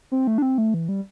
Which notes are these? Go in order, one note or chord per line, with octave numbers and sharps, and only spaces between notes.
C4
A3
D4
C4
A3
E3
G3